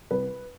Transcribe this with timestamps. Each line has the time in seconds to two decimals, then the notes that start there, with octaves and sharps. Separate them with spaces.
0.11 C2 B4